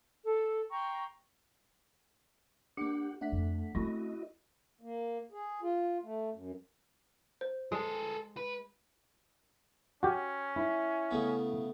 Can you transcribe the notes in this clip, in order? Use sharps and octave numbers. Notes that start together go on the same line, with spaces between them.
A4
G5 A#5 C6 C#6
A#3 D4 G4 F#5
A3 D4 F#5 B6
F2
A3 C4 C#4 E4 F#4 D#5
A#3
G#4
F4
A3
F#2
C5
G#3 G#4 A4
B4
C#4 F#4 G4
E4
C#3 A3 B3